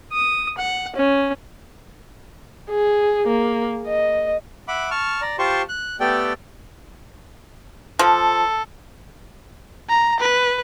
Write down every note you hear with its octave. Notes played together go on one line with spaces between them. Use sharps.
D#6
F#5
C#4
G#4
A#3
D#5
E5 F#5 B5 D6
A5 C#6 F6
D5 A#5
F4 G4 C5 A5 C6 C#6
F#6
A3 B3 G4 A4 D5 G5
F3 A4
A#5
B4